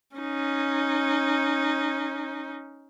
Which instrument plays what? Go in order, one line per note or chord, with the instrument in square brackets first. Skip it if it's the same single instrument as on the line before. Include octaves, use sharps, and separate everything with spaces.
[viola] C#4 D#4